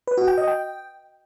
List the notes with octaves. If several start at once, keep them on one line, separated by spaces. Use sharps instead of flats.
B4
F#4
G5
D#5
G5